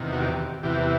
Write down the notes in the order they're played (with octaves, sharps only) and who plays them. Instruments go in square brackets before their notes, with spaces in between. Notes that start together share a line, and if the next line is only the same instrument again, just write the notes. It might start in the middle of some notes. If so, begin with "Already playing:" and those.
Already playing: [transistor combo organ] E2 C3 D#3
F#4
G4
E2 C3 E3 G4